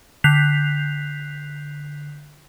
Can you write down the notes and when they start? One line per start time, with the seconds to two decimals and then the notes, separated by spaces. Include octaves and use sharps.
0.24 D3 F#6 G6 B6 C7 F7